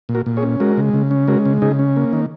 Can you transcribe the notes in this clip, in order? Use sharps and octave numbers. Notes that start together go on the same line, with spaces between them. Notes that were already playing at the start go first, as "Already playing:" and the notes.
A#2
F#4 A#4
A#2
G#4 C#5
C#4
G#3 F#4 A#4
C#3
C#3
C#4
G#3 F#4 A#4
C#3
C#3 D#4 G#4
C#4
A#3
D#3